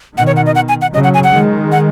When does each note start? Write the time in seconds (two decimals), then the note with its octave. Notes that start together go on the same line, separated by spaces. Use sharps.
0.17 B2 D#3 F#5
0.27 C#5
0.36 F#5
0.46 D#5
0.55 F#5
0.69 G#5
0.82 F#5
0.94 C#3 F#3 D#5
1.04 F#5
1.14 G#5
1.24 F#5
1.34 D#3 G#3
1.72 F#5